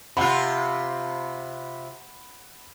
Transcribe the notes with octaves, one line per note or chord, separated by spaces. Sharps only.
C3 F4 F#5 B5